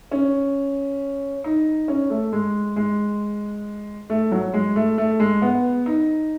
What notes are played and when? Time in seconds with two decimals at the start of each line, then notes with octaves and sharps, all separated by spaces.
0.11 C#4
1.44 D#4
1.88 C#4
2.10 A3
2.33 G#3
2.76 G#3
4.10 A3
4.32 F#3
4.54 G#3
4.76 A3
4.98 A3
5.20 G#3
5.42 B3
5.86 D#4